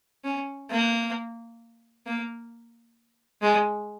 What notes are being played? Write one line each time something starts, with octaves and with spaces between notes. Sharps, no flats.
C#4
A#3
A#3
G#3